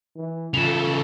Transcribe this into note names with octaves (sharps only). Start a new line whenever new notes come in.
E3
C#3 E3 F4 A4 E7 F7